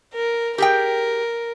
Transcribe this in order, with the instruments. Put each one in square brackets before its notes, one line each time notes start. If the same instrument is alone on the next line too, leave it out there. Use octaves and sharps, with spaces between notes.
[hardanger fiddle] A#4
[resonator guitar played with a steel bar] G4 G#4 G5 [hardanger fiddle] A#4